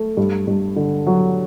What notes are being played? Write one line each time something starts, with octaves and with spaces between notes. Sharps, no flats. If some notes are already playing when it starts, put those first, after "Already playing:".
Already playing: A3
G2
G2
D3
F#3